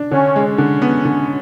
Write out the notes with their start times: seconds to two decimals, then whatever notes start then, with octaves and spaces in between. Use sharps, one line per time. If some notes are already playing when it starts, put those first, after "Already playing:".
Already playing: D4
0.11 D3 C#4
0.36 G#3
0.47 C#4
0.58 D3
0.82 B3
1.05 D3